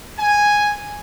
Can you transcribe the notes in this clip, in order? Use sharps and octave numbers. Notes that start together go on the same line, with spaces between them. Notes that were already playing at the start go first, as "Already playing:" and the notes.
G#5